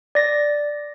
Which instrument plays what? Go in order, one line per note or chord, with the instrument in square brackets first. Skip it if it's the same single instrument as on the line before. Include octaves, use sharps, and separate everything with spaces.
[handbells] D5 A#6